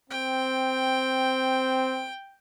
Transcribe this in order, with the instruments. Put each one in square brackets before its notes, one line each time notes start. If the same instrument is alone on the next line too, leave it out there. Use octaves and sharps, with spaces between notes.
[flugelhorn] C4 [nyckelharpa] G5